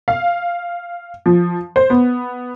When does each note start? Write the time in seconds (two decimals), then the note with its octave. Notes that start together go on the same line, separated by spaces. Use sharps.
0.08 F5
1.26 F3
1.76 C5
1.90 B3